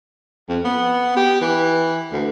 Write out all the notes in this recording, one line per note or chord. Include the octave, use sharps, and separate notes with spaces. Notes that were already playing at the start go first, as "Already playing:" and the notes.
F2
B3
G4
E3
D2